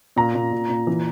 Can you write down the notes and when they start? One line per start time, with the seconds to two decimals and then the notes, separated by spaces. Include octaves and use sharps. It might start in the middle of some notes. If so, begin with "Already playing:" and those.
0.16 A#2 A#5
0.35 A#2
0.52 A#2
0.70 A#2
0.87 E3